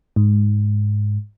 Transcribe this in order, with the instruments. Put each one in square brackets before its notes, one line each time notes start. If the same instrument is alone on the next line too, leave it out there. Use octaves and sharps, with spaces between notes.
[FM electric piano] G#2